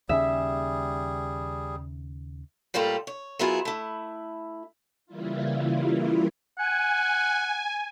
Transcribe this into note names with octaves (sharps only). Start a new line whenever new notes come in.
D#2 C#3 G3 C#4 G#4 E5
A2 G3 A#3 F4 G4 A4
C#5
F#3 A#3 B3 E4 F4 G#4
A3 E4
C#3 E3 G3 A#3 E4 F4
F#5 G#5